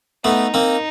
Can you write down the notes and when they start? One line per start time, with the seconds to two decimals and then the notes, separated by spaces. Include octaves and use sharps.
0.24 A3 B3 D#4
0.54 A#3 C4